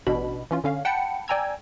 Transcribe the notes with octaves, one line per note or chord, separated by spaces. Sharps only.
A1 B2 D4 B5
E3 C#4 F4
D3 C#4 F5
F#5 G5 A5 B5 C#7
D5 G5 G#5 A#5 E6 G#6